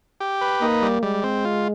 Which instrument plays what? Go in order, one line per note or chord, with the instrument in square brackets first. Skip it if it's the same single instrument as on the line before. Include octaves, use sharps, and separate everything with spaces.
[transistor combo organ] G4
B4
[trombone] A#3 [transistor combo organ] D#4
[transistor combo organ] G3
[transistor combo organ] G3 [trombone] G#3
[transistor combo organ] C4
F4